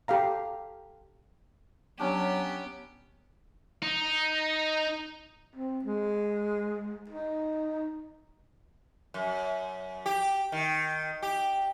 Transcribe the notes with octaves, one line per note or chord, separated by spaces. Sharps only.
G4 A4 F5 A#5
F#3 B3 C#4 D4 G4
D#4
C4
G#3
D#4
F#2
G4
D#3
G4